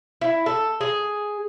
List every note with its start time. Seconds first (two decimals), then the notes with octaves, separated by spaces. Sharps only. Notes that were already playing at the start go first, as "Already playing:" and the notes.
0.21 E4
0.46 A4
0.81 G#4